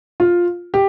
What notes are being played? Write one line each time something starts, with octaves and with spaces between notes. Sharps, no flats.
F4
G4